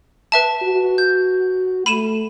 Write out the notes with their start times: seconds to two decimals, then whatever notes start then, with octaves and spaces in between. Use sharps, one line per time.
0.32 B4 E5 A5
0.63 F#4
0.98 G6
1.86 A3 B5 D#7 E7